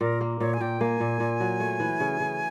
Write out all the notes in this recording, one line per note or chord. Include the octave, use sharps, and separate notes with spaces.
A#2 A#4
A#3
A#2 C#5
G#5
A#2 G5
A#3 G#5
A#2
A#2
F#3
A3
E3
C#3
C#3